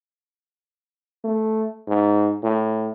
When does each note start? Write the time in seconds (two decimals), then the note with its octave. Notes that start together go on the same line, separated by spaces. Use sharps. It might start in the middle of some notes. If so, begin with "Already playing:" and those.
1.24 A3
1.88 G#2
2.43 A2